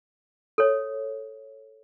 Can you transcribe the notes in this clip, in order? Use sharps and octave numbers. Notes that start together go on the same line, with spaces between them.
A4 C#5